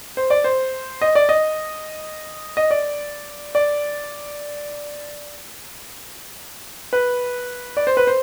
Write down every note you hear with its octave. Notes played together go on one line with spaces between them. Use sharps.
C5
D5
C5
D#5
D5
D#5
D#5
D5
D5
B4
D5
C5
B4
C5